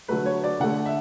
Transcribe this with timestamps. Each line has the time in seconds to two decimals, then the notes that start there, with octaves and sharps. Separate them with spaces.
0.08 D3 F#3 A3 B4
0.26 C#5
0.44 D5
0.60 D3 A3 F#5
0.86 E5